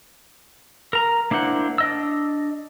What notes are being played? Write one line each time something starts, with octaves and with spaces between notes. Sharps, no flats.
A#4 A#5
A#3 D4 E4 C5 F#5
D4 D#5 E6